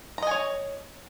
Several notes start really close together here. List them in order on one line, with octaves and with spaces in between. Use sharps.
A#5 D#5 G#5 C#5